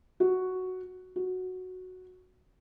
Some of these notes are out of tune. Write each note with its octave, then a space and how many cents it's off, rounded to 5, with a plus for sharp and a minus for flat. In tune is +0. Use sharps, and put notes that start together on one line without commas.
F#4 +0
F#4 -5